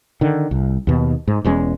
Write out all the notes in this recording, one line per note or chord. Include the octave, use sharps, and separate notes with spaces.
D3 D#3
C2
D#2 B2
G#2
E1 E2 G#3 C#4